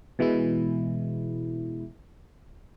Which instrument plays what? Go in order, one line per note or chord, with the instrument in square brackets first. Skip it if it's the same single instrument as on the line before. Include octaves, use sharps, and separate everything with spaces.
[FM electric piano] B2 E3 G#3 E4